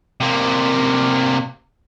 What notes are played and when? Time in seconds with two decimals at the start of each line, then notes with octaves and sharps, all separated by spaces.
0.20 C3 A#3